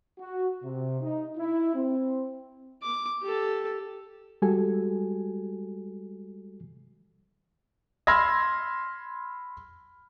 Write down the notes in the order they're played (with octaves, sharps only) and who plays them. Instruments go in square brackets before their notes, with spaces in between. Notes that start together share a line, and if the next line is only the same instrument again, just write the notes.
[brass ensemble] F#4
C3
D#4
E4
C4
[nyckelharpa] D6
G4 A4
[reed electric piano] G3 G#3 F#4 G4 A4 G#5
[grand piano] B5 C6 E6 F6 G#6 A#6